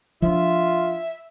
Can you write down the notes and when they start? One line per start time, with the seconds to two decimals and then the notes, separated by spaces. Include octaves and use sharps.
0.22 F3 D4 F4 E5